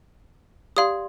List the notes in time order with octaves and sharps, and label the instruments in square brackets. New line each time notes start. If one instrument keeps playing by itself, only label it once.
[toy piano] G4 D5 C6 [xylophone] F5 D#6